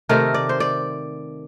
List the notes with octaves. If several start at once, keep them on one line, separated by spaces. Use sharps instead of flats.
C3 D#3 A3 A#4
D5
C5
D5